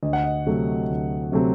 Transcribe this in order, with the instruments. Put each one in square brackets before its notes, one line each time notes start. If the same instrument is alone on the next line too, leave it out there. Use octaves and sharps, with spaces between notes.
[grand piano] D2 D#5
F#5
D#5
C3 F#3 A3 C4
D2
C3 F#3 A3 C4